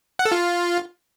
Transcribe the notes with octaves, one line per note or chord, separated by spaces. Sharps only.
F#5
A4
F4